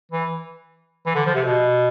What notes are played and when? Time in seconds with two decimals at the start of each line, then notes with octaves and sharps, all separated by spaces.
0.12 E3
1.06 E3
1.15 D3
1.26 F3
1.35 C3
1.45 B2